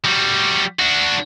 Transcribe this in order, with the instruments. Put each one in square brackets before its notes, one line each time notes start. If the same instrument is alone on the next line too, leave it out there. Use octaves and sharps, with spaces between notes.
[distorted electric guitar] G3 F#4
D4 F#4